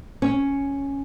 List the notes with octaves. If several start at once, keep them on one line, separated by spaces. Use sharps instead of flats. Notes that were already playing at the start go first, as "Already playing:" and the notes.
C#4